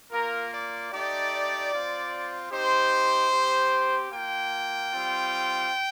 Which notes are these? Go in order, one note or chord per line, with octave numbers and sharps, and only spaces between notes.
A#3 F4 A#4
D5
A3 D#4 G4 D5
C4 F4
C4 D#4 G4 C5
C4 G4
A#3 F4 G5
G3 C4 F4